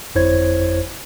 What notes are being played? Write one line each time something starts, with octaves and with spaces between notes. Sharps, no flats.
G1 F2 E4 C5 C#5 G#6